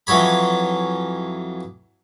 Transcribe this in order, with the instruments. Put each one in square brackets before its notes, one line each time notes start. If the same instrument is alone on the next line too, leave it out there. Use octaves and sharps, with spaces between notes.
[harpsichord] F2 E3 F#3 C#5 B5